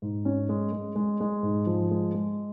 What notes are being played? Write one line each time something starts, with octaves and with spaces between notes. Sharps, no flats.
G#2
C#4
G#3
G#3
G#3
G#3
G#2
F3
G#3
G#3